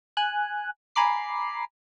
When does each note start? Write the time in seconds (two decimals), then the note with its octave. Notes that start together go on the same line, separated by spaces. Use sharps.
0.17 G#5 F#6
0.96 G#5 A#5 B5 D6 C7